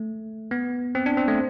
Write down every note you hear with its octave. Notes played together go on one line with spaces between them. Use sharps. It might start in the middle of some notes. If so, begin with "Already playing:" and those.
Already playing: A3
B3
C4
D4
C4
A3